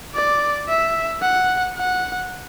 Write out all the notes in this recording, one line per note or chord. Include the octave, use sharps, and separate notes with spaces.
D5
E5
F#5
F#5